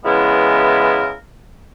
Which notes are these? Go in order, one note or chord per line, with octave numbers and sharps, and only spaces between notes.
C#3 E3 G#3 B3 E4 A#4